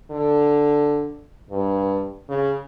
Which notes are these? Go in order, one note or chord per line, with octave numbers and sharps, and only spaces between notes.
D3
G2
C#3